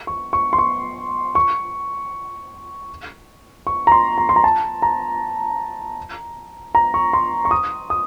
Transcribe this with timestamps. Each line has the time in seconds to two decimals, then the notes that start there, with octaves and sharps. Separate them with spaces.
0.07 C#6
0.33 C#6
0.53 C6
0.58 C#6
1.35 C#6
3.67 C#6
3.87 A#5
3.92 C6
4.18 A#5
4.29 C6
4.36 A#5
4.44 A5
4.82 A#5
6.75 A#5
6.94 C#6
7.13 C6
7.45 C#6
7.51 D#6
7.90 D#6